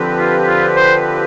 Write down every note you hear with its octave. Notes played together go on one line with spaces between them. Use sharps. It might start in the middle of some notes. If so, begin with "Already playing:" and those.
Already playing: D3 F3 C4 G4 B4
F4
F4
C5